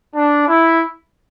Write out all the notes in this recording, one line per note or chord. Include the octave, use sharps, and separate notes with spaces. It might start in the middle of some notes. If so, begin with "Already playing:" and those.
D4
E4